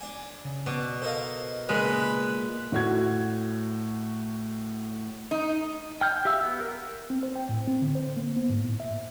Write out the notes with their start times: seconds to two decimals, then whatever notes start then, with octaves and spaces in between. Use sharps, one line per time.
0.01 D4 G#5
0.45 C#3
0.66 B2 D4
1.02 A4 A#4 C5 D#5 F5
1.69 A#2 C#3 G#3 A#4 B4
2.72 A2 F#4 G#6
5.31 D#4
6.01 G5 F6 G6
6.25 G4 E5 F5 E6
6.43 B3
6.60 A#4
7.10 C4
7.23 C5
7.36 G5
7.49 A2
7.67 C4
7.82 D3
7.95 C5
8.17 A#3
8.36 B3
8.50 G#2
8.64 A2
8.80 E5